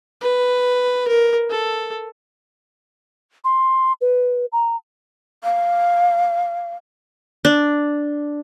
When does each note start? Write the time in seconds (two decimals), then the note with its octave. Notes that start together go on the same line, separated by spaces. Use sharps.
0.21 B4
1.08 A#4
1.50 A4
3.44 C6
4.01 B4
4.52 A#5
5.43 F5
7.45 D4